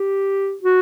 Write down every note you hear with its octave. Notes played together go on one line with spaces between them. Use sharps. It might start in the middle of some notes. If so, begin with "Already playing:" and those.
Already playing: G4
F#4